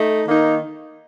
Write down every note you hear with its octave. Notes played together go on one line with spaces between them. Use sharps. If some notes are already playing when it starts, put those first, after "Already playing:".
Already playing: A3 D#4
D#3 A#3 D#4